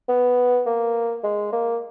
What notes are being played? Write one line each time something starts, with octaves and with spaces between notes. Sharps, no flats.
B3
A#3
G#3
A#3